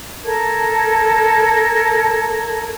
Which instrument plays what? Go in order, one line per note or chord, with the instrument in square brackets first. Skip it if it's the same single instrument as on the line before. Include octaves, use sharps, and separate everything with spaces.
[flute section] A4 A#4 A5 G#6